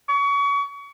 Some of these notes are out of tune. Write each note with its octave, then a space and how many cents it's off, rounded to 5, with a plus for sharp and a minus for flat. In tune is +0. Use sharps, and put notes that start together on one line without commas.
C#6 +30